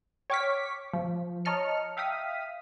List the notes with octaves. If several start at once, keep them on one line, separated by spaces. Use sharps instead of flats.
C#5 G5 C#6 D6 F6 B6
F3
C#5 D#5 A5 A#5 F6 C#7
E5 F5 G5 D#6 B6